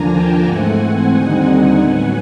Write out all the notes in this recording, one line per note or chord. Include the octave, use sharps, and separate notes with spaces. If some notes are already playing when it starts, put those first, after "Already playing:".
Already playing: D#2 D3 F3 A#3 D4 G#5 A#5
G5 A5
G#2 E3 A3 C4 F#5 G#5
D#2 D3 G3 C4 D#4
F#5 G#5
A2 F#3 B3